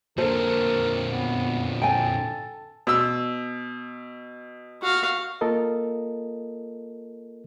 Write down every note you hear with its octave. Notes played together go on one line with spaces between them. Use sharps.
A#2 D3 A4 A#4 C5
B3
A4 G5 G#5
B2 E6
F#4 F5
A#3 F4 A4 A#4 D#5